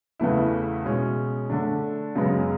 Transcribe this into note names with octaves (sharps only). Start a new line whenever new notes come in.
E2 C#3 E3 A3 E4
B2 G#3 C#4
D3 A3 D4
F#2 C#3 G#3 B3